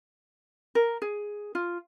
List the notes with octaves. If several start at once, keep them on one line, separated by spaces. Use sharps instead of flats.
A#4
G#4
F4